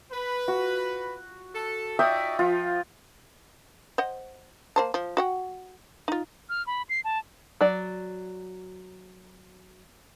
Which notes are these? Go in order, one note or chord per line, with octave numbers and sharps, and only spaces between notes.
B4
F#4
A4
D#4 F#4 D5 E5 G5 D#6
F3 F4
C5 D#5 F#5
A#3 C5 A5
F3
F#4 F#5 G5
D#4 F4
F6
B5
C7
A5
F#3 D5